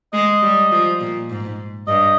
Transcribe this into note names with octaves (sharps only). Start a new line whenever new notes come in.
G#3 D#5
G3
F3
A#2
G#2
G2 D#5